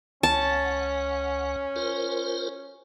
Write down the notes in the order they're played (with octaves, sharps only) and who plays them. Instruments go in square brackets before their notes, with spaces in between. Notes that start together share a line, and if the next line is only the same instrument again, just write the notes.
[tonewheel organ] C#2 F#5 [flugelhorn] C#4 [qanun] A5
[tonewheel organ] F4 A#4 C5